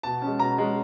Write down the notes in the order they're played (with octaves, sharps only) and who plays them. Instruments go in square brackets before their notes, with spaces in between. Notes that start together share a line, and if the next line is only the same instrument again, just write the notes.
[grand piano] B2 A5
G#3 C#4
B2 A#5
G#3 C#4